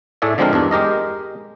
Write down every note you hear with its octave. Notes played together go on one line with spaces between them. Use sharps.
A2 A3 G#4 D5 E5
D3 F3 G#3 C4 D4 A#4
E2 G2 D4
G#3 G4 A#4 D#5